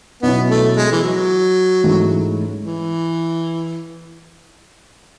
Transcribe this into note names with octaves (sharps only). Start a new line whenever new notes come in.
B2 F#3 B3 C#4 E4
A3
G#3
E3
F#3
G#2 E3 A3 C#4 E4
E3